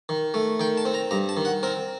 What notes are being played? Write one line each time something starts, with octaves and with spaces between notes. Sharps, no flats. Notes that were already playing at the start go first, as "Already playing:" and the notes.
D#3
A3
D#3 G5
A5
C4
A#5
G2 A#5
A5
D#3
F#5
C4 A#4